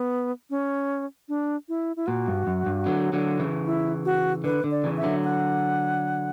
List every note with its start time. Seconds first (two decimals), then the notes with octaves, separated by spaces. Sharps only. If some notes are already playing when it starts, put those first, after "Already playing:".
Already playing: B3
0.50 C#4
1.29 D4
1.69 E4
1.96 E4
2.07 A#2 F#4
2.28 G2
2.47 F#2
2.66 G2
2.86 D3 F#3
3.13 D3 F#3
3.39 C#3 E3
3.65 E4
4.05 F#4
4.44 D3 B4
4.64 D3
4.71 D5
4.84 C#3 E3
4.97 E5
5.03 D3 F#3
5.24 F#5